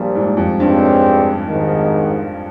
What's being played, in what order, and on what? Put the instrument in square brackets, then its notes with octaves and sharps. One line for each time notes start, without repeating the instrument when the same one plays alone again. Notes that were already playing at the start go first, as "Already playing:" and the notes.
Already playing: [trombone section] A#1 A#2 F3 [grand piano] G3
[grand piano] G#2
F2
[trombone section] C#2 C#3 G3 C4 [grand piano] G2
[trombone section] G#1 G#2 D#3